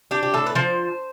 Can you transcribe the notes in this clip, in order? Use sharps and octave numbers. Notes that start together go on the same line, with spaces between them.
D4 G4
G4
A2 A4
B4
F3 C5